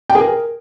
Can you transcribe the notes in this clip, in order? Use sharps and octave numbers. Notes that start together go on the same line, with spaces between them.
G5
G#4
A#4